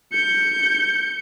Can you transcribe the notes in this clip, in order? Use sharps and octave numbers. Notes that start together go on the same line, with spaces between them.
G6 C#7